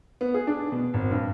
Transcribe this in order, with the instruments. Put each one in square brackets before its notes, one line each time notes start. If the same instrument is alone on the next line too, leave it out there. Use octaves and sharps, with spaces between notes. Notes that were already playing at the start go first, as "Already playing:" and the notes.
[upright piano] B3
G#4
D4
B2
G#1
G2